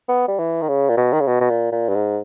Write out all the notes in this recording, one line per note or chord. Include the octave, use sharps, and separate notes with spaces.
B3
G3
E3
D#3
C#3
A#2
B2
D#3
C#3
B2
B2
A#2
A#2
G2
G#2